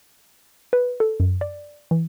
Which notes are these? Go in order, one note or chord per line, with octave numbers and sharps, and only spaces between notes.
B4
A4
F#2
D5
E3